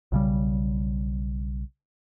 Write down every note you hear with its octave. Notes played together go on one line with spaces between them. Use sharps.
B1 C#3 G3